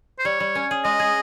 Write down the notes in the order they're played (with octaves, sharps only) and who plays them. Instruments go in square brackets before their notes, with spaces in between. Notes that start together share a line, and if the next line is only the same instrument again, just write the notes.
[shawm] C5
[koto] G3 [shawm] C#5
[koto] G3
C#4
G#4
[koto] G#3 [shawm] D#5
[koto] G#4